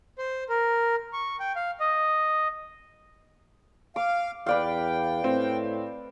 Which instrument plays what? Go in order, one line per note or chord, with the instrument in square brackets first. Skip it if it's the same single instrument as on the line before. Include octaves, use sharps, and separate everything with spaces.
[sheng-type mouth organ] C5
A#4
C#6
G5
F5
D#5
[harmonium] F5 [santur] D6
[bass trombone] E2 [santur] B4 D5 F5 [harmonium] G5
[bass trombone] A2 [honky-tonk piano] C4